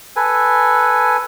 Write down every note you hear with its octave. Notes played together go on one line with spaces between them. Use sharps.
A4 B4 G#5